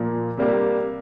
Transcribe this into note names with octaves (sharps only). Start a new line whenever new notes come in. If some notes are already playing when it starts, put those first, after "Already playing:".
Already playing: A#2 F3 A#3
C3 G3 A#3 D4 G4